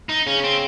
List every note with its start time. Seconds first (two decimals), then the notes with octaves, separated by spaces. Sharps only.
0.09 D#4
0.26 C#3 C#4
0.44 C4